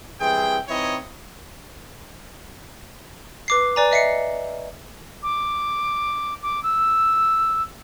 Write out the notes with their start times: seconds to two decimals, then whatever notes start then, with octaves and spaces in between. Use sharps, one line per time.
0.20 E3 G3 C4 G#4 G5
0.68 E3 C4 D#4 E4 C#5 D#5
3.48 B4 D6 C7
3.76 B4 D5 G#5 A#5
3.91 D#5 E5 C7 C#7
5.23 D6
6.43 D6
6.63 E6